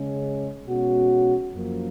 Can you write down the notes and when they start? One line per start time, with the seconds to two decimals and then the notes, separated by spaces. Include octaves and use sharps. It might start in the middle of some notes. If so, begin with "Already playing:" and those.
Already playing: C#3 G#3 C#4
0.68 B2 G#3 C#4 F#4
1.53 F#2 F3 A#3